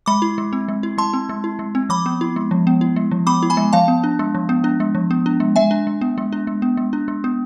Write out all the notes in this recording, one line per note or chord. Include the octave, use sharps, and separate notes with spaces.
G#3 B5 D6
E4
G#3
C4
G#3
E4
G#3 A5 C6
C4
G#3
E4
G#3
C4
F3 B5 D6
B3
E4
G#3
F3
B3
E4
G#3
F3
B3 B5 D6
E4
G#5 B5
G#3
F3 F5 A5
B3
D4
G#3
F3
B3
D4
G#3
F3
B3
D4
G#3
G#3 E5 G#5
D4
G#3
B3
G#3
D4
G#3
B3
G#3
D4
G#3
B3